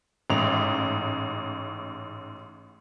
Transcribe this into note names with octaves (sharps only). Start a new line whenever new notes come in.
A1 G#2 F7